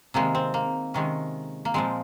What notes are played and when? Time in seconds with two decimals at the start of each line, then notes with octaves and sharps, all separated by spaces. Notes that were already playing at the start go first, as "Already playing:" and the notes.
0.14 C3 D#3 G#3 A#3
0.35 C4
0.54 A#3
0.94 C3 D#3 G#3 C#4
1.65 A#3
1.74 A#2 F3 G#3 C4